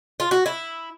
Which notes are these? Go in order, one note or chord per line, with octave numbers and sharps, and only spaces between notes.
F4
F#4
E4